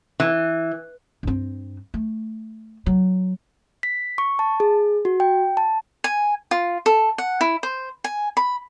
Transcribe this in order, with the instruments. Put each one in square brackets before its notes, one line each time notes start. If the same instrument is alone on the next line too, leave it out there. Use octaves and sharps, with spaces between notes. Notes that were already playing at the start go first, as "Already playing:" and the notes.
[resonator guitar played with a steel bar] E3
[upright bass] G2 C4
A3
F#3
[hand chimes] B6
C#6
A5
G#4
F#4
G5
A5
[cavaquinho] G#5
F4
A4
F#5
E4
C5
G#5
B5